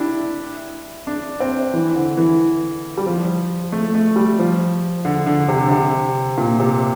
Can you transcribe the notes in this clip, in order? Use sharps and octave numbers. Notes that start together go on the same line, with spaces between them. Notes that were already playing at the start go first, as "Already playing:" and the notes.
Already playing: D4 E4 G4
D4
C4
E3
D3
E3
G3
F3
A3
A3
G3
F3
D3
D3
C3
D3
C3
A#2
C3